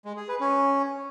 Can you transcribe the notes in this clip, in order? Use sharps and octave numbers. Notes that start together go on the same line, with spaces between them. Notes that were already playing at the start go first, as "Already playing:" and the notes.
G#3
G#4
B4
C#4